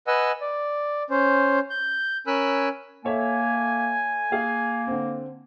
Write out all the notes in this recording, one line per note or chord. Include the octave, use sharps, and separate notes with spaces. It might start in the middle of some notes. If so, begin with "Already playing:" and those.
B4 D#5 F#5 G#5 E6
D5
C#4 C5
G6
C#4 A#4 G#5 B5 E6 F#6
A#3 A4 C#5 E5 G#5
A#3 G#4 F5
D3 C4